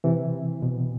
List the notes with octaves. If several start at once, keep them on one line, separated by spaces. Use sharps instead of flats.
C3 E3
B2